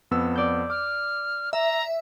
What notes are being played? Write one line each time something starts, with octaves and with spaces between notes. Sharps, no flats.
F2 B3 E6
D5 G6
D6 F6
E5 A#5